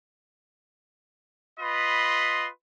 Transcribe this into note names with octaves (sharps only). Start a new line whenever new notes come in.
F4 B4 D#5 B5 C6